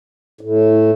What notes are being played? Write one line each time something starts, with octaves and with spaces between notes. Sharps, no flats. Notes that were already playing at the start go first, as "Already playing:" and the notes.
A2